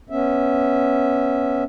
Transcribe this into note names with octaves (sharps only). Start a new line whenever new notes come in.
B3 C#4 E5